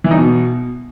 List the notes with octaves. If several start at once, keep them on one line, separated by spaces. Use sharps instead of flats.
E3
D#4
B2